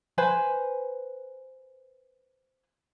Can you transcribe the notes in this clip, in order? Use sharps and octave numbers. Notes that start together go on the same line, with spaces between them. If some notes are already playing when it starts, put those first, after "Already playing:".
B4 C5 G#5